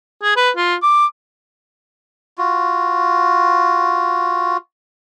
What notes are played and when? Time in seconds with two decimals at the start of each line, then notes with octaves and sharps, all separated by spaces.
0.23 G#4
0.37 B4
0.57 F4
0.83 D6
2.38 F4 F#4